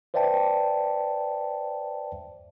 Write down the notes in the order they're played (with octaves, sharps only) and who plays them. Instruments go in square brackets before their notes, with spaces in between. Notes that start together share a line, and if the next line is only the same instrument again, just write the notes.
[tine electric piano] B4 C5 D5 E5 G5 A5